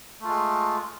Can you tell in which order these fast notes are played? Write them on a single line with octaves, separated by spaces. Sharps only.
A3 F4 G#3